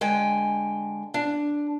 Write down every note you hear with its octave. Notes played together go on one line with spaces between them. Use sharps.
D3 G#3 G5 G#5
D4